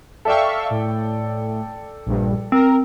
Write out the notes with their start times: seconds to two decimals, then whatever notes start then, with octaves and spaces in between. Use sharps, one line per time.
0.25 A4 D5 E5 F5 G5 C#6
0.70 A2
2.06 A#1 G2
2.52 C4 A#4